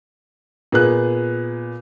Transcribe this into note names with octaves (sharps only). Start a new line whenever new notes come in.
A#2 B3 G#4 F#6